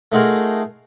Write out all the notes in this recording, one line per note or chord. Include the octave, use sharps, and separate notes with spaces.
A3 D#4 F4 F#4 G#4 A#4